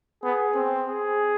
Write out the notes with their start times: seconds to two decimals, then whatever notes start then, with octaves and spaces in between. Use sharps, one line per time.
0.23 B3 G#4
0.56 C4
0.88 G#4